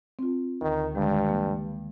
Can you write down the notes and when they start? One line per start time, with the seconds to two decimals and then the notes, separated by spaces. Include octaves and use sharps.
0.19 C4 F4
0.61 D2 D3 D#3
0.95 G2 D3 D#3 G#3
1.29 E3 A#3